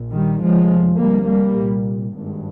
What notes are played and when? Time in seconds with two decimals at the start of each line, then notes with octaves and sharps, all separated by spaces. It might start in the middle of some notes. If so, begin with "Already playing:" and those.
Already playing: A#1 A#2
0.11 D#3 G3
0.40 F1 D#2 F3 G#3
0.98 D2 C3 G3 A#3
1.27 G3 A#3
1.56 C2 A#2
2.13 G#1 G2